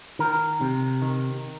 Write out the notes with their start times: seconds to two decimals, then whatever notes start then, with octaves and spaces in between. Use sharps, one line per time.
0.19 D#3 A#4
0.61 C3
1.02 D#3